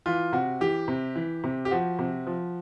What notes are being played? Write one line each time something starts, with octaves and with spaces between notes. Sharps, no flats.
E3 F4
C3 F#4
E3 G4
C3
E3
C3
G4
F3 F#4
C3
F3